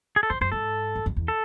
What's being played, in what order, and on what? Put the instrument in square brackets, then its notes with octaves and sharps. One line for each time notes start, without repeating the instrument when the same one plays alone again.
[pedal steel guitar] G#4
A4
[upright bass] F#2 [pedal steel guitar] C5
[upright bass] F#2 [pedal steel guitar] C5
[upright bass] G#2 [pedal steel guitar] A4
[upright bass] F#2
F#2
E2
[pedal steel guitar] A4